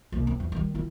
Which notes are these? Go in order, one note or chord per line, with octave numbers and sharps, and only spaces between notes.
C2 A#3
C4
E2
D#3 G3
D#3 E4